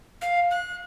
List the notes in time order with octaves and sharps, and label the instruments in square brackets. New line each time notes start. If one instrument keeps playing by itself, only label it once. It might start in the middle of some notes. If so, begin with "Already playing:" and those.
[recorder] F5
F#6